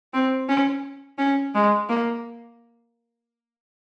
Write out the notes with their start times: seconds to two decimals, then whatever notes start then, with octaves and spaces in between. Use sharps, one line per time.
0.14 C4
0.49 C#4
1.18 C#4
1.55 G#3
1.89 A#3